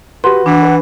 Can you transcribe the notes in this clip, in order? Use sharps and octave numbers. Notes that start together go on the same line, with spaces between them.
F#4 G4 B4 C6
E3 D4 F#5
B4